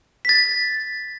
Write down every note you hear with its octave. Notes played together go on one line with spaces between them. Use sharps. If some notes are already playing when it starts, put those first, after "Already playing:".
A6 B6